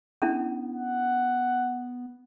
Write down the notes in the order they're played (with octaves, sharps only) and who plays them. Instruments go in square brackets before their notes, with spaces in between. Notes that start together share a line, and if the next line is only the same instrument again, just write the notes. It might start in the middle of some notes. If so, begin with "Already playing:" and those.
[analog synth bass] B3 [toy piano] C#4 D4 E4
[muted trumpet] F#5